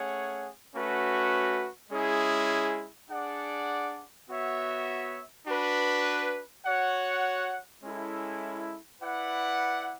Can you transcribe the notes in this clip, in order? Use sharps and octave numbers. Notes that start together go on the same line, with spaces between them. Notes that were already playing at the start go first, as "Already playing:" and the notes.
Already playing: A3 C#4 G#4 C#5 F#5
A3 C#4 F#4 B4
G#3 C#4 E4 G#4
D4 G#4 D5 F#5
B3 F#4 C#5 E5
D4 F#4 B4
F#4 C#5 F#5
G#3 C#4 E4 A4
E4 B4 D5 F#5